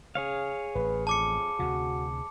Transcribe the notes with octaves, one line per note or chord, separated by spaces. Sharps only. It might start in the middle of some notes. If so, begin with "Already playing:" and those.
C#3 G#4 C#5 F5
A1 B4
F2 A5 D6 C#7
D2 C3 F#4